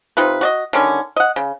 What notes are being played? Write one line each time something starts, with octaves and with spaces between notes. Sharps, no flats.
C3 D#4 F4 B4
F#4 D5 D#5
D3 D#3 G3 C#4
D#5 F#5
C#3